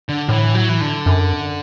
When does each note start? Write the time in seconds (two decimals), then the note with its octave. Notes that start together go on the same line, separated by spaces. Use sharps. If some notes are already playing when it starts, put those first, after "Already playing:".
0.09 D3
0.28 A2 E3
0.55 F#3
0.69 E3
0.81 D3
1.06 F#2